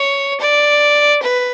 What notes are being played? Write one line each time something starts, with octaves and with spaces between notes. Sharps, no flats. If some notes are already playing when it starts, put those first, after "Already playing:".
Already playing: C#5
D5
B4